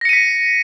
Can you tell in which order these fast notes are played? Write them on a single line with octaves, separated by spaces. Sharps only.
A#6 C#7 D#7 B6